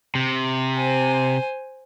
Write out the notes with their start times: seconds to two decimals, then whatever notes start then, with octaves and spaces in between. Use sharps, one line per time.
0.15 C3
0.76 C5 G#5